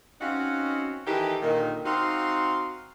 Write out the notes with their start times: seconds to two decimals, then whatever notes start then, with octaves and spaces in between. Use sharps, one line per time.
0.21 C4 C#4 D#4 F#4 F5 F#5
1.07 D#3 E3 D#4 G4 A4 G5
1.42 A#2 D3 D#3
1.85 C4 D#4 F#4 F5 C6